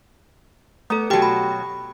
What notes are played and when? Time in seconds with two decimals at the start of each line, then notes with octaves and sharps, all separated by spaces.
0.90 A3 B3 A4
1.10 B2 F#3 G4 G5
1.22 B5